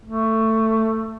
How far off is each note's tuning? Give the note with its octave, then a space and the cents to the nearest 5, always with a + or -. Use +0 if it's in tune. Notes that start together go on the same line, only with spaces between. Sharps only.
A3 +15